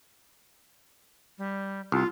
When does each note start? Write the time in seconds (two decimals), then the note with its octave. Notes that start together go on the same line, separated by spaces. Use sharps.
1.38 G3
1.92 C2 F4